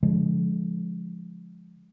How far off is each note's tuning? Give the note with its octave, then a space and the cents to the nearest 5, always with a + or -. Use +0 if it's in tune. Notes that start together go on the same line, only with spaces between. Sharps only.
D3 -40 F3 +0 G#3 +0